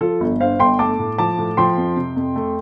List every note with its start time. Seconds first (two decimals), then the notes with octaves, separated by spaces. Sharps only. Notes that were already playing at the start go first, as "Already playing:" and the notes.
0.01 F3 F4 A4
0.20 G1
0.40 G2 C5 F5
0.59 G1 G5 C6
0.79 A3 A5 D6
0.99 A2
1.18 F3 A5 D6
1.38 A2
1.57 F3 G5 C6
1.77 F2
1.97 C3
2.16 F2
2.36 A3